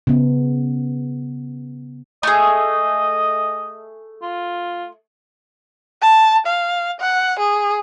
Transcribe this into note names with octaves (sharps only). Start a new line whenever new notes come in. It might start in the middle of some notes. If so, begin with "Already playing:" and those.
C#3 B3
A3 G#4 D#5
F4
A5
F5
F#5
G#4